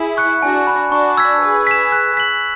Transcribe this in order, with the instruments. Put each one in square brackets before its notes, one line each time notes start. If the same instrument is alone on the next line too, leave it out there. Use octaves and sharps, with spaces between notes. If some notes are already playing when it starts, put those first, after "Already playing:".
Already playing: [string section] E4 G#4
[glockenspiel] C#6 F#6 C#7
[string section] D4 F#4 [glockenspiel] G#5
[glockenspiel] B5 F#6
[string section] D4 F#4 [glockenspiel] C#6
[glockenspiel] E6 G#6 B6
[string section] G#4 B4 [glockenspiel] E6
[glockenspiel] B6 E7
F#6
B6 F#7